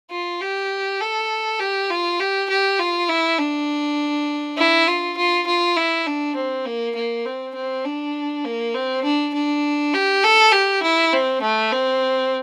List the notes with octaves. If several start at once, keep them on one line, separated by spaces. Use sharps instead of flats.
F4
G4
A4
G4
F4
G4
G4
F4
E4
D4
E4
F4
F4
F4
E4
D4
C4
A#3
A#3
C4
C4
D4
A#3
C4
D4
D4
G4
A4
G4
E4
C4
A3
C4